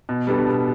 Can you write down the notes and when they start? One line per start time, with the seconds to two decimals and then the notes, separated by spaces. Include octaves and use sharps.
0.09 B2
0.27 G3 B3 D4 A4
0.47 B2